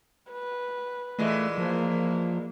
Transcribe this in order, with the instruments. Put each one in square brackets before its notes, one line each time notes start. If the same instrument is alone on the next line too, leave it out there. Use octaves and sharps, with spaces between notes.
[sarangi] B4
[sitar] A#2 E3 G#3 [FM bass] A3
[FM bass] F3 [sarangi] A#3